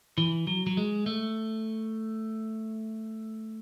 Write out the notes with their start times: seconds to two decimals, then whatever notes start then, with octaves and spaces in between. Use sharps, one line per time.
0.18 E3
0.47 F#3
0.67 F#3
0.77 G#3
1.06 A3